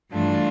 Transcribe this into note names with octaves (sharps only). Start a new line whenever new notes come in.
G2 E3 A3 D4 F4